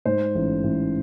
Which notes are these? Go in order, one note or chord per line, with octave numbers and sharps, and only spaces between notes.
G#2 C5
A1
A1